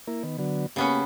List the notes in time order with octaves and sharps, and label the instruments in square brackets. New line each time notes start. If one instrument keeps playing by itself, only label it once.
[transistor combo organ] A#3 E4 A#4
D#3 B3
D3 F#3 B3
[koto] C#3 B3 C#4 [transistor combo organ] A#3 G4